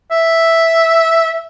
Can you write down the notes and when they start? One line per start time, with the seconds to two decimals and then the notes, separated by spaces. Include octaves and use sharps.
0.11 E5